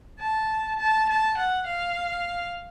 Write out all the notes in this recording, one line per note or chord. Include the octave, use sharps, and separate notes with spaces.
A5
A5
A5
F#5
F5